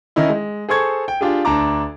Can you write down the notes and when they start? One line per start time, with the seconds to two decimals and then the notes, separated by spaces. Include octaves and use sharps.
0.16 D#3 C#4 D#4 E4
0.29 G#3
0.69 G#4 A4 C5 C#6 G#6
1.08 G5
1.21 D4 F4 G4 G#4
1.45 D2 D4 A5 A#5 D6